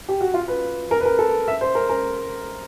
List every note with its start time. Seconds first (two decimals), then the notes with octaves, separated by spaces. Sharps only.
0.09 G4
0.21 F#4
0.34 F4
0.48 B4
0.91 A#4
1.01 B4
1.05 A#4
1.19 A4
1.48 E5
1.61 C5
1.75 A#4
1.89 A#4